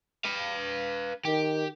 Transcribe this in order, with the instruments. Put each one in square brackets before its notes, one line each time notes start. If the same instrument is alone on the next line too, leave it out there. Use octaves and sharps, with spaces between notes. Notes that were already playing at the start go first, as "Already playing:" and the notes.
[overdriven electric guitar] B4 F5
[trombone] D#3 [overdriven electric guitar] G4